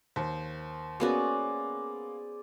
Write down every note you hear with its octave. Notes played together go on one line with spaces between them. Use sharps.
D#2 C5
A#3 B3 C#4 F#4 G#4 D5